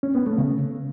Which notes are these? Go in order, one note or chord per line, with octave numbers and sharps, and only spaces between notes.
C#4
B3
A3
C#3